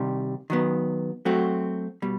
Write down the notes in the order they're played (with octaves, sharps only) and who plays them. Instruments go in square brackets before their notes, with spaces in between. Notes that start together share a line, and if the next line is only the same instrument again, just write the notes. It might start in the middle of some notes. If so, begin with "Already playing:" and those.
Already playing: [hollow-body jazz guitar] C2 C3 D#3 G3
D#3 F#3 B3
F#3 A3 C4 F#4
B2 G3